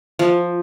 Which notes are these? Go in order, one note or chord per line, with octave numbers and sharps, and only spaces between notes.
F3